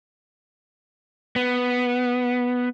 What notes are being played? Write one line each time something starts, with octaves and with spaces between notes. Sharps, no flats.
B3